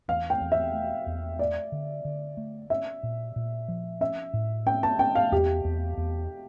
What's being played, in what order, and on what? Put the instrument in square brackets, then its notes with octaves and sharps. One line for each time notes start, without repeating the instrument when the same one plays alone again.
[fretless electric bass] E2 [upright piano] F5
[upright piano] G5
[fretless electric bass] E2
[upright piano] E5
[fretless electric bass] A3
E2
[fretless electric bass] A3 [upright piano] D5
[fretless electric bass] D3
D3
A3
[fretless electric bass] C#4 [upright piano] E5
[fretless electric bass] A#2
A#2
F3
[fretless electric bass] C#4 [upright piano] E5
[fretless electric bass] A2
[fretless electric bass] C#4 [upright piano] G5
[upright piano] A5
[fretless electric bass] C#4 [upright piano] G5
[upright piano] F5
[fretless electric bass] E2 [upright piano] G4
[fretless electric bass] E2
E2